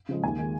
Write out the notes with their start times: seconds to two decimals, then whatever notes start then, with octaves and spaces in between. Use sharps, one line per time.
0.09 C#3 F3 G#3
0.24 D#2 G#5
0.38 D#3 G#3